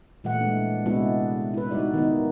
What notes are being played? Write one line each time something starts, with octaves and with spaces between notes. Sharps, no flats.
A#2 E3 G3 A3 F#5
G#3 D4
C3 G#3 B3 D4 E4 F#4
E4 B4
G3 D#4 F#4 D5
D#3 B3 D#4